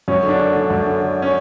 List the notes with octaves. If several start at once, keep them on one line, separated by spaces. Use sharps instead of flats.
F#2 C#4
D3
D4
D3
D3
F#2
D3
D3
C#4